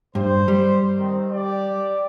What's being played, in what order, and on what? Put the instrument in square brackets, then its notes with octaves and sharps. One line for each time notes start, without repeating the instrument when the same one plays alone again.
[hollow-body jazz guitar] G2 [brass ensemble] C5
[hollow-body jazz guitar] G3
[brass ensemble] D#3 C4
G4 D5